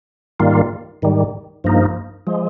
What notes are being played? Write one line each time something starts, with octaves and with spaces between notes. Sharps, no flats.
G#2 D#3 G3 A#3 F4
G#2 D#3 G3
G2 F3 A#3 D#4
F3 G#3